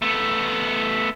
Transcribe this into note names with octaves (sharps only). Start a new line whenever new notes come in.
A3 B3